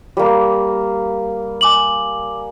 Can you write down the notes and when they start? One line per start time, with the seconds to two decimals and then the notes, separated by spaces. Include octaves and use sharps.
0.17 G3 A#3
1.61 G#5 D6 F#7